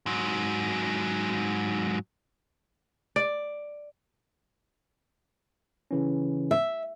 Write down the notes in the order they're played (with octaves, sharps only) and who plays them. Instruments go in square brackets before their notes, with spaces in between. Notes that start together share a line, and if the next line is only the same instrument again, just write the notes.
[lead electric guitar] G#2 F#3
[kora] D5
[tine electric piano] C#3 E3 C#4
[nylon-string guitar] E5